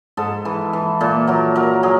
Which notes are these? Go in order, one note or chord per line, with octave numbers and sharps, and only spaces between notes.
G#2 A4
E3
E3
A#2 A4
F#3 A#4
F#3 A#4
F#3 G#4